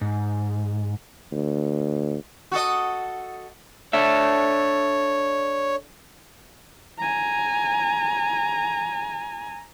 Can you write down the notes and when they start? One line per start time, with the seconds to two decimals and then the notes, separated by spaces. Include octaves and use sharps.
0.01 G#2
1.32 D2
2.52 F#4 A4 D#5
3.93 D4 A4 C#5 E5
6.98 G#5 A#5